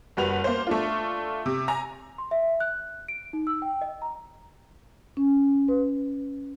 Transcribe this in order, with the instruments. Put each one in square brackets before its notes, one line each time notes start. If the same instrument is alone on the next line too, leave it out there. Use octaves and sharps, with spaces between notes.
[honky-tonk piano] F#1 G3 F#4 B4 F7
A#3 C5
A3 D4 F4
C3
G#5 A#5
[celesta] C6
E5
F#6
D7
D#4
E6
G5
D#5
A#5
[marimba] C#4
B4